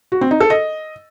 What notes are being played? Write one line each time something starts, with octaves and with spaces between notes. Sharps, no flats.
F#4
C4
D#4
A4
D#5